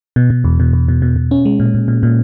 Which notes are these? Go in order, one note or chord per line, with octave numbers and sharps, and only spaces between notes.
B2
B2
E2
B2
E2
B2
B2
B2
C#4
G#3
A#2
A#2
A#2
A#2